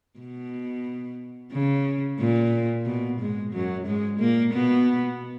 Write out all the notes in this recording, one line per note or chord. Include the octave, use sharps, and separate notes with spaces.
B2
C#3
A#2
B2
G#2 G#3
F#2 F#3
G#2 G#3
A#2 A#3
B2 B3